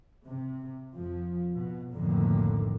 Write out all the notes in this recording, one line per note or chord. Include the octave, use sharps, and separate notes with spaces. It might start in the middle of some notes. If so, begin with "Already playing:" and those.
C3
F2 F3
B2
B1 F2 A2 D3 D#3 A#3